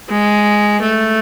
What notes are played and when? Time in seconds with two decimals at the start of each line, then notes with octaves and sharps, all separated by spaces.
0.09 G#3
0.82 A3